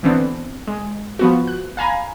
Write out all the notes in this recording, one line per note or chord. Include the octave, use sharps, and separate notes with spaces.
D3 E3 B3 C4 D4
G#3
F3 B3 F#4
F#6
F5 G#5 A#5 B5